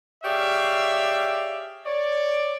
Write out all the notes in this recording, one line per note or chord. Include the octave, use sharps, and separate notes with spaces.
G4 G#4 C#5 D5 E5 F5
C#5 D5